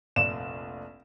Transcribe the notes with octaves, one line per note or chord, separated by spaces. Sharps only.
F1 A#1 D5 E7